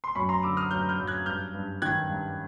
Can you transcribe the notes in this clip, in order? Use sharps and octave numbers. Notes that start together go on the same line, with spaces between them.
C6
F#2 B5 C#6
A#5 C6
D3 D6 E6
D#6 F6
F#2 F6 G6
F6 G6
F#2
F#6 G#6
G2 F6 G6
G2
D#3 F#6 G#6
G2